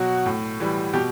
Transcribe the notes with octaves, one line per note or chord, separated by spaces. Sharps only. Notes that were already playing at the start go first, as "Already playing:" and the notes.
Already playing: B2 F#3 F#4
A2
E3 G3
B2 G4